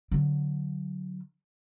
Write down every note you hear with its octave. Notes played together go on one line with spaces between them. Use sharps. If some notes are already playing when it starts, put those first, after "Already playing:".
D3 F#3